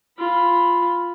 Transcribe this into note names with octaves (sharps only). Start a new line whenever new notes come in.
F4 B5